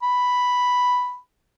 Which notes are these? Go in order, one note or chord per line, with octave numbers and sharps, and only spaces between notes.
B5